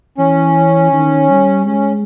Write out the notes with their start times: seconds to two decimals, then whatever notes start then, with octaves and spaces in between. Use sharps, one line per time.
0.18 E3 C#4
0.93 D#3
1.30 G3
1.66 G#3 C#4